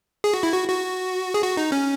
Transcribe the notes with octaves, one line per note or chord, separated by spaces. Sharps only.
G#4
F#4
E4
F#4
F#4
G#4
F#4
D#4
C#4